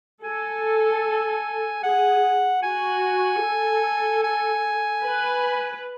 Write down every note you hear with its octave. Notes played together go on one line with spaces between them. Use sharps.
A4 G#5
G#4 F#5
F#4 G#5
A4
G#5
B4